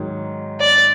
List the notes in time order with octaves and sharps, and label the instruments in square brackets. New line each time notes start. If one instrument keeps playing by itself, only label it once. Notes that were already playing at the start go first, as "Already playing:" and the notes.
Already playing: [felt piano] G#2 D#3 F#3
[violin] D5